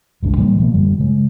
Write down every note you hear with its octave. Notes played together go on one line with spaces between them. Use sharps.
F#1 C#2 G2 D4
A2 E3 G3 A#3
B2 F3 A#3 B3
F#2 D3 G3
C#3 G#3